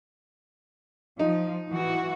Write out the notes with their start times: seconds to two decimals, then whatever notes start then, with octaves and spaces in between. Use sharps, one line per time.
1.19 F3 D#4
1.69 E3 F#4